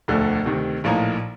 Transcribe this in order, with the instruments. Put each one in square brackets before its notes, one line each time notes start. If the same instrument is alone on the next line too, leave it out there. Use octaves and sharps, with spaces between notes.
[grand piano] E1 D2 D3 F3 A3
D2 C3 D#3
A#1 A2 F3 A#3 D#4